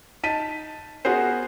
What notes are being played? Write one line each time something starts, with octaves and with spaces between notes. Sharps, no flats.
D#4 A5 B6 D#7
B3 F#4 G#4 A#4 C5